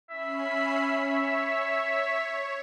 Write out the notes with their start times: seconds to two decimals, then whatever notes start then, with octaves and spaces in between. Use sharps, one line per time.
0.10 C#4 E5 B5 C7
0.81 C#5